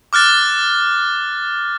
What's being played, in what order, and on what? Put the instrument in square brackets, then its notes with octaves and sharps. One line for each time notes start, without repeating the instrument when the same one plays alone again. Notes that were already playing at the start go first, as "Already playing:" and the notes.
[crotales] D6 F6 F#6 A6